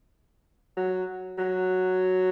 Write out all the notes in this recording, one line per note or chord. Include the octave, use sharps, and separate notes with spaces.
F#3
F#3